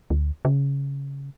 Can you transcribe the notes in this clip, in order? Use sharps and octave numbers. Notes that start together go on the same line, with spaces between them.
D2
C#3